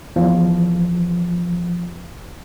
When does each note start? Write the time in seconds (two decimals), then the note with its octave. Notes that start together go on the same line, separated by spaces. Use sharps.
0.16 E2 F3